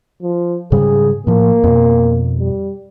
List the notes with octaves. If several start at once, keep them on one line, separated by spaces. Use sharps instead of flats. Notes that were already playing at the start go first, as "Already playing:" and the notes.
F3
G#2 C#3 G3 G#4
A2 F3 A#3
F2 B2
G3